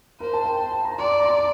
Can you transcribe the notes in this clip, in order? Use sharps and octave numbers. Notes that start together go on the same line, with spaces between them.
A#4 C5
A5
G5
A5
A5
A#5
D5 C6
D6
A#5
C6
D6